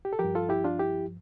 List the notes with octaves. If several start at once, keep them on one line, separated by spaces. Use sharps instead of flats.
G4
A4
F3 G4 A#4
G2
F4 A4
E4 G4
D4 F4
E4 G4